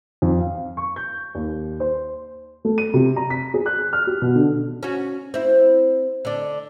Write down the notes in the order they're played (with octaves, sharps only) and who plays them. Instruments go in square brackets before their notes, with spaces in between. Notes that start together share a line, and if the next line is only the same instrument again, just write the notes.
[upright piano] F2
F5
C#6
G6
D#2
C5
[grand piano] A3
D#7
C3
A#5
B6
G#4
F#6
F6
G4
B2
D3
[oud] C#4 F#4
C4 E4
D3 D4